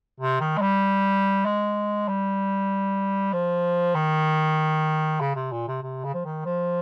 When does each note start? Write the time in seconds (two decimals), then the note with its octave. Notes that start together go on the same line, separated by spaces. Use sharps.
0.20 C3
0.40 D#3
0.57 G#3
0.62 G3
1.45 G#3
2.08 G3
3.33 F3
3.95 D#3
5.21 C#3
5.36 C3
5.52 A#2
5.68 C3
5.83 C3
6.05 C#3
6.14 F3
6.25 D#3
6.45 F3